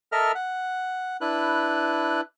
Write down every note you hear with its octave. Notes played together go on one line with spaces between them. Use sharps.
A4 A#4 D#5 E5 F6
F#5
D4 E4 B4 F#6